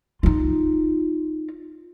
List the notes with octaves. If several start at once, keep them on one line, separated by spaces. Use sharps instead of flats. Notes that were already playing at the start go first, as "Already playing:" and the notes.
D#4 F4